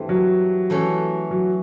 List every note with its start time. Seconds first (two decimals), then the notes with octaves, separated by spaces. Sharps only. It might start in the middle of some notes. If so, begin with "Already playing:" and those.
Already playing: G2 E3 A3 C4
0.09 F#3
0.70 E3 A3 C#4
1.31 F#3